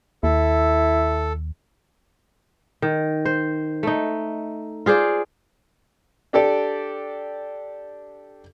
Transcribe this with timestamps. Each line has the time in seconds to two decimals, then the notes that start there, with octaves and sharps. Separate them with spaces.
0.23 D#2 E4 A4
2.82 D#3
3.25 C5
3.83 A3 D#4
4.86 F4 G#4 C5 D5
6.33 D4 G4 A4 D5